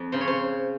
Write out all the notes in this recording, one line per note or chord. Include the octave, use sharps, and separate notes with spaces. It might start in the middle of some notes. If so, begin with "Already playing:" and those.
Already playing: F2
C#3 C5
C#5
C5